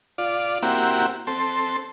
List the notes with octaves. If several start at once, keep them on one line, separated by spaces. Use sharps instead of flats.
F4 D5
A#3 C4 E4 F#4 G4
C4 A4 C6